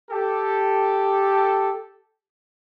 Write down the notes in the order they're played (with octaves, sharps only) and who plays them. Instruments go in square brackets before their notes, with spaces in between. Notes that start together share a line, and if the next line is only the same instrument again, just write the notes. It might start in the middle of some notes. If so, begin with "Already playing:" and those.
[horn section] G4 A4